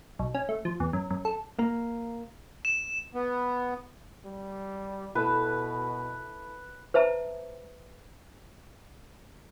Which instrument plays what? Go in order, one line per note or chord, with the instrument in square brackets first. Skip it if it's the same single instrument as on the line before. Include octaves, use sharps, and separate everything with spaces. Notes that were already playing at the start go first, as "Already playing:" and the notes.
[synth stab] B1
C#4
A3
F3
E2
F#2
F#2
A4
[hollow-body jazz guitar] A#3
[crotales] E7
[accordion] B3
[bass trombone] G3
[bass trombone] B2 [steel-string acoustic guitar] E4 A4 [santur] B4
[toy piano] B4 C5 E5 A5 A#5